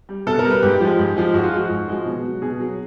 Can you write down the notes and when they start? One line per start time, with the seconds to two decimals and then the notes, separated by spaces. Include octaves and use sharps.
0.09 G3
0.27 B2 A4
0.39 A#4
0.44 G3
0.51 B4
0.63 G#2 G4
0.81 F3 G#3
0.99 G#2
1.17 F3 G#3
1.34 G#2 F#4
1.44 F4
1.52 F3 G#3 F#4
1.70 G#2
1.88 F3 G#3
2.06 B2
2.24 F#3
2.42 B2 G#4
2.60 F#3